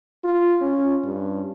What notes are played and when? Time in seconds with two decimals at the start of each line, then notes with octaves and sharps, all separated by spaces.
0.24 F4
0.61 C#4
1.04 G2